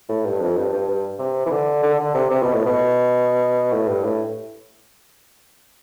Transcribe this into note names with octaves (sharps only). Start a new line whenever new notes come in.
A2
G2
F2
G2
G2
G2
C3
E3
D3
D3
D3
C3
C3
B2
A2
B2
A2
G2
A2